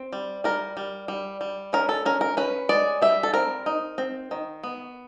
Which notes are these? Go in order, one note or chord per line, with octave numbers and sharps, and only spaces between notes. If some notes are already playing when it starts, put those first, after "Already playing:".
Already playing: C4
G3
G3 A#4
G3
G3
G3
C#4 A#4
A4
C#4 A#4
A#4
C#4 B4
G#3 D5
G3 E5
A4
C4 A#4
D#4
C4
D#3
B3